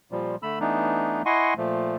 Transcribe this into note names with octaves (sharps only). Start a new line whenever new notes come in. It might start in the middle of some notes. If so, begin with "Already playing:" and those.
A#2 F3 G3
D3 A3 B5 E6
E3 A3 B3 D4 D#4
E4 D#5 F#5 G#5 C6 C#6
A#2 F3 A3